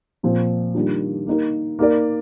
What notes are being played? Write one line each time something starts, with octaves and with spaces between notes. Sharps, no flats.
A#2 F3 C4
D#3 G3 A#3 D4 F4
A#3 D#4 A#4
A#3 D#4 A#4 D5